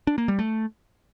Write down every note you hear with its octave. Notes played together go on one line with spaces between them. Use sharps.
D4
A#3
G3
A3